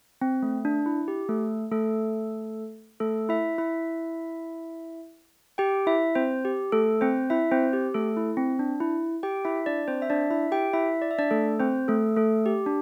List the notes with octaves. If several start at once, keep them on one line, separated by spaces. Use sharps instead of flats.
C4
A3
D4
E4
G4
A3 A4
A3 A4
A3 A4
E4 E5
E4 E5
G4 G5
E4 E5
C4 C5
G4
A3 A4
C4 C5
E4 E5
C4 C5
G4
A3 A4
E4
C4
D4
E4
G4 G5
E4 E5
D4 D5
C4 C5
E5
D4 D5
E4 E5
G4 G5
E4 E5
D5
E5
D4 D5
A3 A4
C4 C5
A3 A4
A3 A4
G4
D4